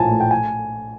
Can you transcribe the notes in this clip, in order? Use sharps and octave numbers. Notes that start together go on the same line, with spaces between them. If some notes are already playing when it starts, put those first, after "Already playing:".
Already playing: A#1 A2 F3 G#5 A5
A3
G5
G#5